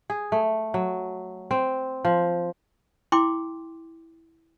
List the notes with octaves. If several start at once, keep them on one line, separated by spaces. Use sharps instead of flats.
G#4
A3
F#3
C4
F3
E4 G5 C6 D6